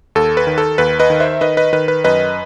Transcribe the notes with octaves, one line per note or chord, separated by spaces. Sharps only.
D#2 A4
B4
D#3
A4
D#2 B4
B4 D#5
D#3
C5 E5
D#3 B4 D#5
B4 D#5
D#3 B4
B4
F#2 B4 D#5